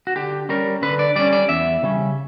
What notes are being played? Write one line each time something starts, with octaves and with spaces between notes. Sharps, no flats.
F#4
D3 G4
G3 C#4 A#4
D3 B4
D5
G3 C#4 D5
D5
E2 E5
C#3 G3 C#4